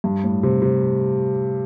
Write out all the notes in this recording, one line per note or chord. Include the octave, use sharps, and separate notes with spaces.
G2
A2
C3
C3